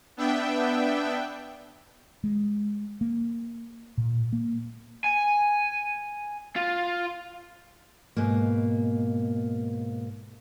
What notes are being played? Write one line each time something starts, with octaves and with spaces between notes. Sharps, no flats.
B3 D4 E5 G5
G#3
A#3
A#2
A#3
G#5
F4
G#2 B2 A#3